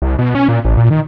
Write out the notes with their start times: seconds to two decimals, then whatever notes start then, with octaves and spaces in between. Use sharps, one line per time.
0.02 C2
0.19 B2
0.35 C#4
0.48 A#2
0.65 A1
0.77 A#2
0.90 D#3